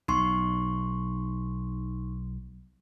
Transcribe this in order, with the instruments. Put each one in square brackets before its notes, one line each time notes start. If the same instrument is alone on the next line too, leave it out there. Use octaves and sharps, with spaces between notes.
[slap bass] B1 [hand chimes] D#4 C6 C#6